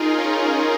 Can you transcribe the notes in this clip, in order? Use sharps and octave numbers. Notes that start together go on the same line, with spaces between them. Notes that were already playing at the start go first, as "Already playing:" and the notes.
Already playing: D#4 F4 G#4 A#4
C#4 F4